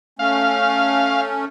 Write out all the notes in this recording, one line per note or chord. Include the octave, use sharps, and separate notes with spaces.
A3 C#4 F5